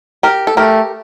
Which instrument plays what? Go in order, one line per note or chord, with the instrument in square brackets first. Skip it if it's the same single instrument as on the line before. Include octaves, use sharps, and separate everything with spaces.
[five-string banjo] G4 A#4
A4
[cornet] A3 [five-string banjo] G4 A#4